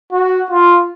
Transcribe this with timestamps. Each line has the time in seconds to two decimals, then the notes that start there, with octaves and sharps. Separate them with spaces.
0.12 F#4
0.51 F4